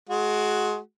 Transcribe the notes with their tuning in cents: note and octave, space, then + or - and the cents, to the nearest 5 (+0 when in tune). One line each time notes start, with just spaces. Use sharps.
G#3 +25 F#4 +0